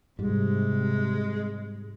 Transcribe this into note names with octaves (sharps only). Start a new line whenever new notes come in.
G#2 C3 G3 G#3